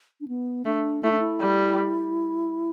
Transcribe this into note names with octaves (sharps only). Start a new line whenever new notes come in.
D4
B3
A3 D4
A3 E4
D4
E4
G3